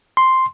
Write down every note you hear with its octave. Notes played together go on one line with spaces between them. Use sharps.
C6